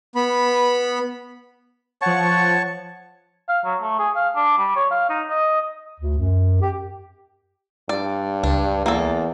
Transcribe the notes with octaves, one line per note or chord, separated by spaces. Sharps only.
B3 B5
F3 C#5 F#5 A5 C#6
F5
F#3
A3
G#4
F5
D4
G3
C#5
F5
D#4
D#5
D2
F#2
G4
G2 D5
C#2 D4
E2 A#3 A4